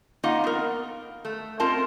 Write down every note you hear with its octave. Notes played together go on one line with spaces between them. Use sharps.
A#3 D#4 F4 D#5 F#5
B3 A#4
A3
C4 F4 A#4 D#5 A5